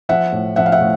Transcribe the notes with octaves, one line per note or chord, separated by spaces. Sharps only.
F3 E5 F#5
A2
F3 E5 F#5
F5
E5 F#5
A2